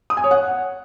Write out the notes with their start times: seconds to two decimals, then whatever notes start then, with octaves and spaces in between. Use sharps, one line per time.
0.10 D#6
0.17 G#5
0.24 C#5
0.31 F#5